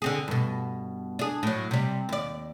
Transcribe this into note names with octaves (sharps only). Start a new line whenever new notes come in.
D3 C4 G#4
G2 B2
D4 G#4
A2 F#3
C3 G3
D#2 D5